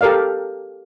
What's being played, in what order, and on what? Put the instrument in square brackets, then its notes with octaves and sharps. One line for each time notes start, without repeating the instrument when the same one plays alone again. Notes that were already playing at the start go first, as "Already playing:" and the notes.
[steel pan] G4 A4 A#4 D5 F5